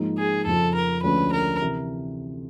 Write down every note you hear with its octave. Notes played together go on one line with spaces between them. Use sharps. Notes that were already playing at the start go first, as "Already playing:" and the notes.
Already playing: G#2 F3 A#3 D#4
G#4
F2 C#3 F3 A4
A#4
D2 D3 F3 G#3 C#4 B4
A#4
C3 E3